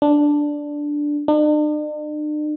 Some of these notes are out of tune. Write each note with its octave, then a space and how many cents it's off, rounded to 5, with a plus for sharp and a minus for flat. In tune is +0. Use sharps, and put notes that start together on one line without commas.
D4 +0
D4 +45